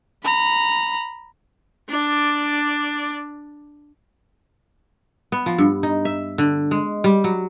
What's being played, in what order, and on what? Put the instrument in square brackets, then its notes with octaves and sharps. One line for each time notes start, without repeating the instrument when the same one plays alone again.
[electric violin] A#5 B5
[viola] D4 D5
[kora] B3
F3
G2
D#4
E5
D3
G#3
G3
F#3